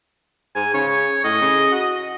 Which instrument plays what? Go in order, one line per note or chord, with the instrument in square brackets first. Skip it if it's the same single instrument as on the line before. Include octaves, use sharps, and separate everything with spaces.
[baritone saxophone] G#2 [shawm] G#5
[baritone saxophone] C#3 [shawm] C#5
[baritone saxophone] A2 [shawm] D#5
[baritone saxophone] C#3
F#4